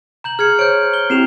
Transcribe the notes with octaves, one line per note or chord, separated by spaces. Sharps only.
A#5 G6 F#7
G#4 F6 G#6 C#7
C5 C#5 G6 D7
G7
C4 E4 G4 C7 E7 F7